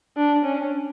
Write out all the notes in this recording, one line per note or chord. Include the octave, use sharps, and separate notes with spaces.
D4
C#4